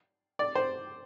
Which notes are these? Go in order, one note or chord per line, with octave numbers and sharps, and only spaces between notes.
D5
C5